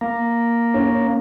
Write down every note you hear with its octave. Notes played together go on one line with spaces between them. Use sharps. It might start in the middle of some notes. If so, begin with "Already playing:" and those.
A#3
C#4